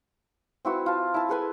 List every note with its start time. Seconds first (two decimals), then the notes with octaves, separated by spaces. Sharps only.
0.65 C4 E4 F#4 B4
0.86 F4 A5
1.14 E4 A5
1.29 G#4 A4 B4 G#5